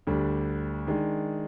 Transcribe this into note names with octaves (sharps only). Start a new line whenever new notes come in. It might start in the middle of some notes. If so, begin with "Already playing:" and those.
D2 D3 G3 D4
D#3 G#3 D4